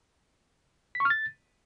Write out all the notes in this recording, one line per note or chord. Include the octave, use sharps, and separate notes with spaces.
B6
C#6
F6
A6